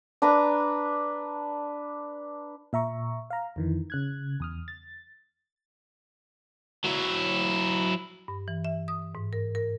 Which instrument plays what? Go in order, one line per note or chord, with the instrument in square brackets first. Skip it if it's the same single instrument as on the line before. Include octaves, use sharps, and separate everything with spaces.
[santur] D4 B4 A#5
[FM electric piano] A#2 E5 A#5 C#6
F5 A#5
F2 D#3 E3
C#3 F#6 G#6
E2 D#6 F6
A6
[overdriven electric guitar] F#3 E4
[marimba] G2
E3
E5
D#6
G#2
A#4
A#4